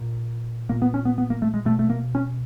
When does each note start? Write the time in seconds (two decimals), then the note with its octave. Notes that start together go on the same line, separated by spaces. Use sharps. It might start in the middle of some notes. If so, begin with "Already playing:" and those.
Already playing: A#2
0.69 A#2 A#3
0.82 B3
0.94 C#4
1.05 B3
1.18 B3
1.30 A#3
1.42 A3
1.54 G#3
1.65 B2 A3
1.79 A3
1.90 A#3
2.15 C#4